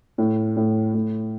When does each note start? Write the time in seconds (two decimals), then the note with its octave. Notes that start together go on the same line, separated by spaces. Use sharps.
0.18 A2
0.56 A2
0.94 A2